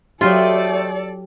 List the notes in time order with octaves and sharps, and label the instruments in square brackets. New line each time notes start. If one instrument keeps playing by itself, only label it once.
[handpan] F#3 G4 [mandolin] A3 C5 D#5 [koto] F4 [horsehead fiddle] A4 D5